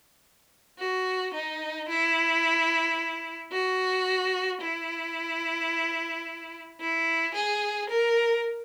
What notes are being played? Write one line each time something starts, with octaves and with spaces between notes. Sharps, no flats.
F#4
D#4
E4
F#4
E4
E4
G#4
A#4